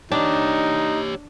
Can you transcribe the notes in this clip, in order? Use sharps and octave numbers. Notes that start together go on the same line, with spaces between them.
D4 D#4 G4 C#5